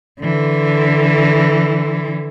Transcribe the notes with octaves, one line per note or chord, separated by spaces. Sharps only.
D3 E3